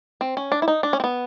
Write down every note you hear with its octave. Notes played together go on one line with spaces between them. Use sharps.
C4
C#4
D4
E4
D#4
D4
C#4
C4
B3